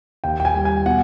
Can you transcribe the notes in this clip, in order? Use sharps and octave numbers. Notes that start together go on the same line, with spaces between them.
D#2 G5
G5
G#5
G3
G#5
B2 F#5